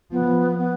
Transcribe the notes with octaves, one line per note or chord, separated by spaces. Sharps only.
F3 B3
B3